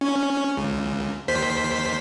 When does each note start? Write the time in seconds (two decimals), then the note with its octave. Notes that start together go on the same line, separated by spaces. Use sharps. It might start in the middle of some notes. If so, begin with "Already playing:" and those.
0.01 C#4
0.57 C#2
1.28 D#2 C5 B6